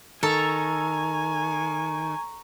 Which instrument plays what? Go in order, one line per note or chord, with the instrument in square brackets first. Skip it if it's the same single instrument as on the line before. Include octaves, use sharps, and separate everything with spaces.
[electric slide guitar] D#3 [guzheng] A4 [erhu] G#5 [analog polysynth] A#5 C#6